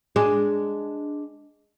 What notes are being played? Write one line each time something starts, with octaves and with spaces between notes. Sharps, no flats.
G#3 D4